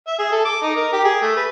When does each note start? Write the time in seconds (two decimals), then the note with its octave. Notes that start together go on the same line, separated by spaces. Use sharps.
0.07 E5
0.19 G#4
0.32 A4
0.45 D6
0.62 D#4
0.76 A#4
0.93 G4
1.04 G#4
1.22 A3
1.37 B4